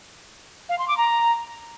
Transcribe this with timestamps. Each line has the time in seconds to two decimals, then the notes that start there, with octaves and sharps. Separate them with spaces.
0.69 F5
0.79 C6
0.88 D6
0.97 A#5